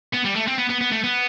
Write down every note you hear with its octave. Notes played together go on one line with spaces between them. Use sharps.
B3
G3
A3
C4
B3
B3
B3
A3
B3